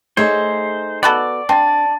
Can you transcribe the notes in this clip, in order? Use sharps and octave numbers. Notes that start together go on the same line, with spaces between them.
A3 D#4 G#4 C5 C#5
B3 F#4 A4 D5
C4 D4 A5 A6